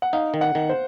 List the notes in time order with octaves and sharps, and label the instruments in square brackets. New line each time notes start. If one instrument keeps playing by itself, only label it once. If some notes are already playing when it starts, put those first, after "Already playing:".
[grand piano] F#5
[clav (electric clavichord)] D#4 [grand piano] F5
[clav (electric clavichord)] D#3
[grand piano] F#5
[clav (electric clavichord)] D#3
[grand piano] C5